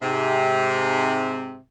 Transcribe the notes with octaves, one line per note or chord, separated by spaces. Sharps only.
G#2 C3